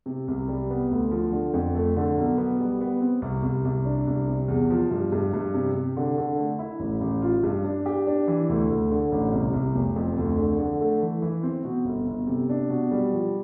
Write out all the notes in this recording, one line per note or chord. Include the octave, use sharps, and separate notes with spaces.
C3
C2
G3
B3
D2
F3
D3
F2
A3
D3
B1
B3
G3
B3
C4
C2
C2
C2
D4
C2
C3
E2
F3
G2
G2
G2
C3
C3
D3
D3
A3
E4
A1
A1
F4
G2
D4
G4
D4
E3
D2
D2
D3
A1
C2
C2
F1
F2
D2
D3
D3
A3
E3
E3
C4
B2
G1
G1
C3
D4
B2
G3
F3